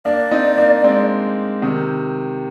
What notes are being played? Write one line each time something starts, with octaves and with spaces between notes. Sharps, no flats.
A#3 D4 D5
C4 D#4
A#3 D4
G#3 C4
C3 D#3